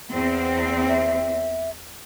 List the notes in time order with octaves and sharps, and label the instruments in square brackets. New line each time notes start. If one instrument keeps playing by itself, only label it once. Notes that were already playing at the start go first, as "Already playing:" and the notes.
[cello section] E2 C4
[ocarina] E5